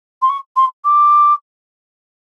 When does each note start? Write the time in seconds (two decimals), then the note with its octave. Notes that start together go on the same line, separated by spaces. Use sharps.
0.22 C6
0.29 C#6
0.57 C6
0.85 D6